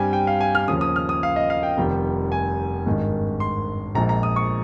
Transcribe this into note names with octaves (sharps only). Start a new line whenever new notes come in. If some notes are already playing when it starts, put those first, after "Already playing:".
Already playing: G2 G3 C4 G5 G#5
G5
F5
G#5
F6
D#2 C#3 F3 D#6
D#6
F6
D#6
F5
D#5
F5
G5
F1 F2 D#3 G3
G#5
G#1 G2 D#3 G#3
C6
A#1 A#2 F3 G#3 A#5
A#5
D#6
C#6